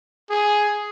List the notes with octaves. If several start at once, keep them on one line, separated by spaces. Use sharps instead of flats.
G#4